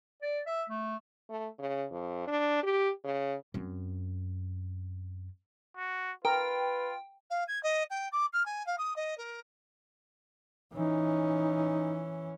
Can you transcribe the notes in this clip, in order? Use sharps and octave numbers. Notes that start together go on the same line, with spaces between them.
D5
E5
A3
A3
C#3
F2
D4
G4
C#3
F#2 C4
F#4
F4 A#4 B4 G5
F5
G#6
D#5
G5
D6
F6
G#5
F5
D#6
D#5
A#4
E3 C#4 D#4